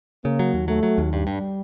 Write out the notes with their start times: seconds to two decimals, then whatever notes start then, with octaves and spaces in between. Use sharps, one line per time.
0.24 C#3 A#3
0.39 F#3
0.54 D#2
0.68 F#3 A3
0.83 F#3
0.98 D#2
1.12 G2 G3
1.27 G2